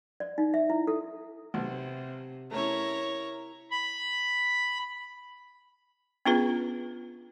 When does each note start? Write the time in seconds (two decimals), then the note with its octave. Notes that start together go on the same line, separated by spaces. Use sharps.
0.20 D5
0.38 D#4
0.54 E5
0.70 E4
0.87 A4
1.54 B1 C3
2.51 A3 C#4 E4 A#4 C#5 A#5
3.71 B5
6.26 B3 C#4 D4 F4 G#4 B4